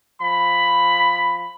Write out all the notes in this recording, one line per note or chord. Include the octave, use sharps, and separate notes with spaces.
F3 B5